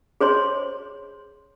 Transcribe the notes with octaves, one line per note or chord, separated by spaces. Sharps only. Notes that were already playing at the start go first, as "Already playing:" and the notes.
G#4 C5 C#5 C6